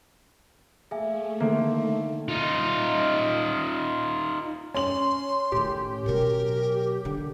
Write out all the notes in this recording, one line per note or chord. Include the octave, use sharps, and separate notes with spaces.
A3 A#3 G#4 E5 G#5
D3 D#3 A#3 C4 E5
D#4 F4
C#4 C6 F#7
A2 D#3 G4
B2 F#3 A#4
D3